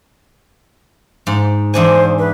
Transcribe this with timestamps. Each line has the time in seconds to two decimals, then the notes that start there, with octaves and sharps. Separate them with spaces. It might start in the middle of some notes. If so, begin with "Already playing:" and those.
1.27 G#2
1.74 E2 D4 C5 G#5
2.19 B4